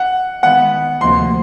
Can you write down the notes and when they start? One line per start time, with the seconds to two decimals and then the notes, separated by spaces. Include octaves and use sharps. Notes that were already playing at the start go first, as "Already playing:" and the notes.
Already playing: F#5
0.43 D#3 G#3 B3 F#5
1.01 D2 C3 F3 A#3 C6